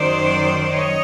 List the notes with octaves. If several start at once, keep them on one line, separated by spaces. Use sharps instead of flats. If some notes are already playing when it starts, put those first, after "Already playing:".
Already playing: F#2 D#3 F#3 C5 D5
C#5 D#5